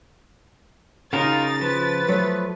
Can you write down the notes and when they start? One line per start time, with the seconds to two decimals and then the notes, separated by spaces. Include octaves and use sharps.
1.13 C#3 D#4 F4 F#4 A#4 A#5 A6
1.61 F3 B4
2.08 F#3 A3